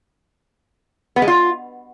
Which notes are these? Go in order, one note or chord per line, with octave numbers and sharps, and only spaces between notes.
B3
G#3
F4